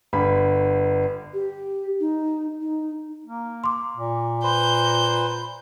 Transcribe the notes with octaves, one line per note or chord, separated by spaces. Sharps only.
G1 B5
G4
D#4
D#4
A#3
C6 D6
A#2
B4 C5 G6